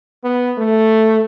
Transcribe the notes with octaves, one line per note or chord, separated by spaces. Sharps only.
B3
A3